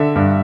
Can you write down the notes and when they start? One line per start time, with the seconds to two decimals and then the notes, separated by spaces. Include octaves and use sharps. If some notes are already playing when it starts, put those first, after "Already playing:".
Already playing: D3 E5
0.15 G2